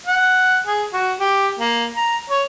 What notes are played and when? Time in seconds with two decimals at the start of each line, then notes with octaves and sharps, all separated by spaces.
0.06 F#5
0.67 G#4
0.93 F#4
1.20 G4
1.59 A#3
1.96 A#5
2.30 C#5